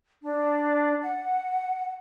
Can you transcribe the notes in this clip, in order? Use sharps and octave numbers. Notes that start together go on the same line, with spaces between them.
D4
F#5